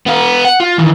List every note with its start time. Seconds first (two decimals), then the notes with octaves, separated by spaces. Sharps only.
0.06 B3 F5
0.45 F#5
0.60 F4
0.78 D#3 E3